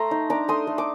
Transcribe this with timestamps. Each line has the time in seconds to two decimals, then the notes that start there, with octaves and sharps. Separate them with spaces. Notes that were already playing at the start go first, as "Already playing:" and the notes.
Already playing: A3 A#5 C6
0.11 D#4
0.30 D4 A#5 D6
0.48 A3 C6 D#6
0.67 A3
0.78 D6